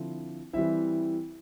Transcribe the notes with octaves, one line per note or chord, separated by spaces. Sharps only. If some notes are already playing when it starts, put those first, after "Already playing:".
Already playing: D3 F3 C4 E4
E3 G3 C4 E4 E5